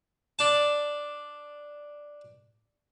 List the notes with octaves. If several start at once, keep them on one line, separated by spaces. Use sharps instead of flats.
D4 A5